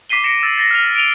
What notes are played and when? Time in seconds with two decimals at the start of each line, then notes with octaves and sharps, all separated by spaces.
0.09 D6 B6 C7 D#7 G7
0.24 A#6 C#7 D7 E7
0.43 E6 A6
0.58 A6 A#6 G7
0.71 F6 A#6 F7
0.95 D7 D#7 F7 G7